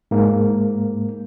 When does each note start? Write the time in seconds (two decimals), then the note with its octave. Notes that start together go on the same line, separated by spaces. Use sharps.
0.11 G#2 A#3